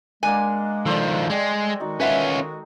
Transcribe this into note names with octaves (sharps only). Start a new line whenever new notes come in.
G#3 A#3 D4 F#5 G#5
D#3 F3 A4 C5 D5
G#3 D5 G5
D#3 G#3 D#4 F#4 D#5
C#4 F4 B4 E5 F#5